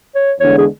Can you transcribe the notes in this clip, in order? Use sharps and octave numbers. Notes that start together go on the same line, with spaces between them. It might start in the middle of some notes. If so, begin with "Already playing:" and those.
C#5
E2 D3 G#3 C#5
G#4